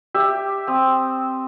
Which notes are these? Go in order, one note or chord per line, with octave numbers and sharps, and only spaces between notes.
G4 E5
C4 D#6